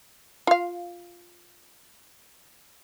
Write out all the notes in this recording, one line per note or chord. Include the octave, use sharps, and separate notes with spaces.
F4 F5